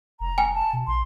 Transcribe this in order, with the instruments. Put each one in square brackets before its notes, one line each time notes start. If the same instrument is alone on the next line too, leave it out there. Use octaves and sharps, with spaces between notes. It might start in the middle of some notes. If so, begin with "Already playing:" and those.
[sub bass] F1 [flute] A#5
[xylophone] G5 G#5
[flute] A5
[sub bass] B2
[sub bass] A#1 [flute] C6